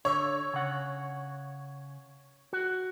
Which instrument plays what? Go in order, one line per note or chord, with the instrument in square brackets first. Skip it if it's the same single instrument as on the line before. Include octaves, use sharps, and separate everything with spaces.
[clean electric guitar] D3 [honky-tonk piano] C#5
[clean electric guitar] C#3 F#5
F#4